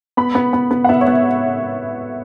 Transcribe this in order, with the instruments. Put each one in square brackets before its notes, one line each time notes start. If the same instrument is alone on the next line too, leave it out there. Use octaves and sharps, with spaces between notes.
[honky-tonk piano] B3 B5
B3
B3
B3
F#5
B3 E5
C#5
B3